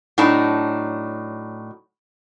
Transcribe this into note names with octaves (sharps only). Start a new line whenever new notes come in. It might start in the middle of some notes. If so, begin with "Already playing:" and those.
A2 F#3 D4 D#4 A5